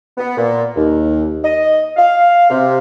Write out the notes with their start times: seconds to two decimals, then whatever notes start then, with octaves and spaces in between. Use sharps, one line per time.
0.18 B3
0.37 A#2
0.76 D#2
1.44 D#5
1.97 F5
2.50 C3